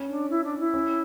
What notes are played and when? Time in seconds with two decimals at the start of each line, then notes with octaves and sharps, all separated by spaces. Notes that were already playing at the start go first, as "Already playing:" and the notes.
Already playing: C#4
0.09 D4
0.30 E4
0.44 D4
0.59 E4
0.74 C#4